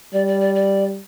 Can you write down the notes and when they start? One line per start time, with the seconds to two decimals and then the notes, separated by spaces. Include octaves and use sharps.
0.13 G3 D5
0.27 D5
0.40 D5
0.55 D5